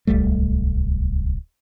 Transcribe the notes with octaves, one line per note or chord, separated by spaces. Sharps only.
D1 C2 G3 A3